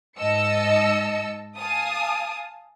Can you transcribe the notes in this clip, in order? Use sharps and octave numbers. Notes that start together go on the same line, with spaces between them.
G#2 D#5 A5 E6 C#7
F5 G#5 A5 D#6